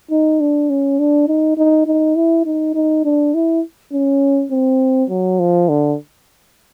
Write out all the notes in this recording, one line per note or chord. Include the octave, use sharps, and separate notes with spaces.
D#4
D4
C#4
D4
D#4
D#4
D#4
E4
D#4
D#4
D4
E4
C#4
C4
F#3
F3
D3